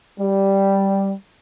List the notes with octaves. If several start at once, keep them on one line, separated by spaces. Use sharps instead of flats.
G3